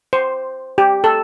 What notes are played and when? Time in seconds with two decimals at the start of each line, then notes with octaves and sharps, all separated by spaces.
0.13 C5
0.78 G4
1.04 A4